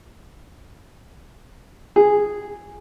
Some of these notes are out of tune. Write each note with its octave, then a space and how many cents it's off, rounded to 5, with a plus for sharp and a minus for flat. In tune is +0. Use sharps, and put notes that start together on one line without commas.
G#4 -5